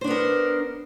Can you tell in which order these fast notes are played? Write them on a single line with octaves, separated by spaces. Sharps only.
C5 D4 B3 A#4